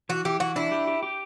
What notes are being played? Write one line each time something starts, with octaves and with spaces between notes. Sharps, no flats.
E3 F#4
E3 G4
E3 F#4
D4 E4
G4
G4
G4